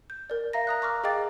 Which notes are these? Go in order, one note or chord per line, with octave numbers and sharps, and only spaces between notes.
G6
A#4 D5
E5 F5 A#5 A#6
A#5 D#6 F#6
A#5 C#6 D6 F6
G#4 D#5 F5 G5 D6 A6